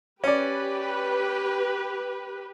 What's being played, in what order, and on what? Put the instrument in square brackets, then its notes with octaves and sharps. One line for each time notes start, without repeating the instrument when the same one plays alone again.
[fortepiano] C#4 D5 [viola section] G4 B4